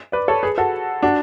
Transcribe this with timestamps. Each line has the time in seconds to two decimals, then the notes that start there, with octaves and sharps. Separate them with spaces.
0.12 B4 D5
0.28 A4 C#5
0.43 G#4 B4
0.58 F#4 A4
1.03 D4 F#4